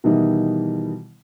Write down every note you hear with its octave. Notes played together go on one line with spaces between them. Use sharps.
B2 D#3 E3 G3 D#4 E4